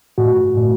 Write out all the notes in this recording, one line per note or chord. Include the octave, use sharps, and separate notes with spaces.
A2 F#4
A2